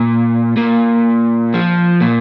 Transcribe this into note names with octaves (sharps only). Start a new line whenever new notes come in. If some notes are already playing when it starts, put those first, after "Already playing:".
Already playing: A#2
A#2
F3
A#2